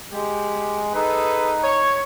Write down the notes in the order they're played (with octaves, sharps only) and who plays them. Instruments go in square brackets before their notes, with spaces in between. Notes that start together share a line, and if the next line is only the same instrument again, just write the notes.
[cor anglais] G#3 [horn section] G4
[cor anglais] D#4 [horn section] G#4 A4 B4
[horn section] C#5